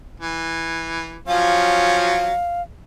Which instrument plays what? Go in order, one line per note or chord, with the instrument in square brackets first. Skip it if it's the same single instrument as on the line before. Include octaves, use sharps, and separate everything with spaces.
[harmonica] E3
[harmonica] F3 F#3 C#4 [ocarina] F5